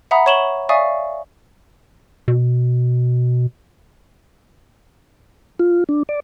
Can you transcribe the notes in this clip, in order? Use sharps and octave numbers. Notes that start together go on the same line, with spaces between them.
E5 F#5 A#5 B5 D#6
C#5 C#6 E7 F#7 G7
D5 E5 F5 G#5 C#6 D#6
B2
F4
D4
D5